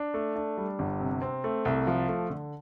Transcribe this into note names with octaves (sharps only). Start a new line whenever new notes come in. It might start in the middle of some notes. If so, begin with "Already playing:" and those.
Already playing: D4
A3
D4
G3
G1
C3
C4
A3
C2
F3
A3
D3